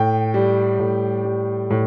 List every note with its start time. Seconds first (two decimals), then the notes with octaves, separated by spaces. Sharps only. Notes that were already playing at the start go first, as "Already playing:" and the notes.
Already playing: A2 G5
0.34 G3
0.79 A2
1.25 G3
1.70 A2